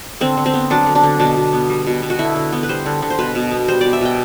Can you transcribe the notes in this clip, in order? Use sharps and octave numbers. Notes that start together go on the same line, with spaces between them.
D3 C4
D3
C4
B3
F#3 D4
D3
D4
D3
B2 D4
B2
B3
G3
B2
B2
F#4
D3 E4
D3
B3
B4
G3 C5
D3
D3
C5
B2 B4
B2
B3
G3 C5
B2 D5
E5
B2 G5